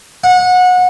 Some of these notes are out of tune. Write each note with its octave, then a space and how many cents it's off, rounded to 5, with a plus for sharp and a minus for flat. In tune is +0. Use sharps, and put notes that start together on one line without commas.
F#5 -25